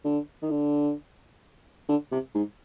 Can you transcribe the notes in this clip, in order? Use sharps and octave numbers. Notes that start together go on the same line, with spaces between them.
D3
D#3
D3
D3
C3
G#2